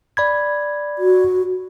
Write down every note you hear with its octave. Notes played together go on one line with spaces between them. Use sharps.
D5 B5 G#6
F#4